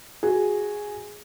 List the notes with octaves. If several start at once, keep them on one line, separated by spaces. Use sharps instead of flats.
F#4 G#4